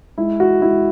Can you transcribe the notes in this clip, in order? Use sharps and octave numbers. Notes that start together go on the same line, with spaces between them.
G#3 E4
F#4
G#3 E4